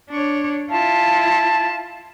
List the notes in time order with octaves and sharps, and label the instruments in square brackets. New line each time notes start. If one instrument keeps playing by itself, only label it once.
[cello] D4 C#5
[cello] E4 F4 [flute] A5